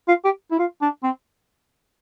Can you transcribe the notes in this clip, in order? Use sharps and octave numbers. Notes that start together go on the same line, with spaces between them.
F4
G4
E4
F4
D4
C4